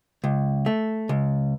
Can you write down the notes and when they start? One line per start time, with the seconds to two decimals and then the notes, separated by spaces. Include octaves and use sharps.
0.24 C#2
0.66 A3
1.09 C#2